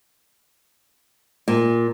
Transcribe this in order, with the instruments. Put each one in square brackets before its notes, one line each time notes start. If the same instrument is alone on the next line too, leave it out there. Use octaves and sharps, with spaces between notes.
[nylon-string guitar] A#2